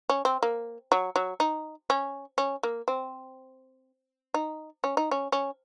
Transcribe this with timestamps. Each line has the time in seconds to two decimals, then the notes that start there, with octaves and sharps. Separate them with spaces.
0.09 C#4
0.25 C4
0.43 A#3
0.92 F#3
1.16 F#3
1.40 D#4
1.90 C#4
2.38 C#4
2.63 A#3
2.88 C4
4.34 D#4
4.84 C#4
4.97 D#4
5.11 C#4
5.32 C#4